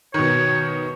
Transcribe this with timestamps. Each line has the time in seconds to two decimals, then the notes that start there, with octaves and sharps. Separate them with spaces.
0.14 B2 D#3 C#5